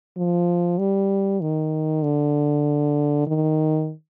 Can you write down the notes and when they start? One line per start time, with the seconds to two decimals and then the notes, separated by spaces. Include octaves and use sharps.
0.17 F3
0.79 G3
1.41 D#3
2.03 D3
3.27 D#3